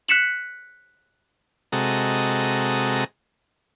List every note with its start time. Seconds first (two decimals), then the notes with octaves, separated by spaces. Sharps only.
0.08 F#6 B6 C#7 E7 F#7
1.72 C3 G#3 F#4 A4 D#5 A#5